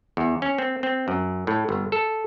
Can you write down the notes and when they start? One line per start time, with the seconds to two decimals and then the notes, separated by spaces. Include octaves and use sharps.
0.17 E2
0.42 C#4
0.58 C4
0.83 C4
1.08 F#2
1.47 A2
1.69 G1
1.92 A4